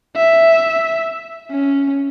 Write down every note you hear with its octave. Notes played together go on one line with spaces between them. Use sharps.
E5
C#4